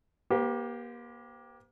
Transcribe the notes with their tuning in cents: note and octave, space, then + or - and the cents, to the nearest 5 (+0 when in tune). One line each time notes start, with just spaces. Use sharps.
A#3 +35 G4 +0 C5 -35